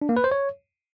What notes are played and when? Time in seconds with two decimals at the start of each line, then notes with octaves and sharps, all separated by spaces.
0.02 D4
0.09 A#3
0.17 B4
0.24 C5
0.31 C#5